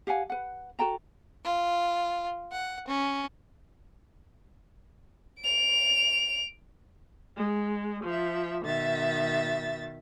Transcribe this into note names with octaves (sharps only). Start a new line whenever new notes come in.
G4 F5 F#5 G#5
B4 F#5
F#4 A4 G5 A#5
F4
F#5
C#4
D7 F7
G#3
F3 E5
B2 D#3 E5 A6